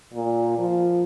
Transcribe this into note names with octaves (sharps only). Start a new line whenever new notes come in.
A#2
F3